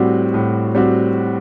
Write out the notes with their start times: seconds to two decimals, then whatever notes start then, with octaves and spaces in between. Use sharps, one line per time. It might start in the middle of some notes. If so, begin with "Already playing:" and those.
Already playing: A2 G3 C4 F#4
0.34 A2
0.75 G3 C4 F#4